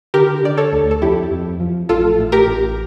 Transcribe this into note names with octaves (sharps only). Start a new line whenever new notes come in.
D3 G4 A#4
D3 D5
A4 C#5
D2
A4
F2 E4 G4
F2
F3
A1 F4 A4
A2
G4 A#4
A1